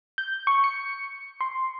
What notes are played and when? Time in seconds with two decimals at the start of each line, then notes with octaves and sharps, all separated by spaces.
0.18 G6
0.47 C#6
0.64 C#7
1.41 C6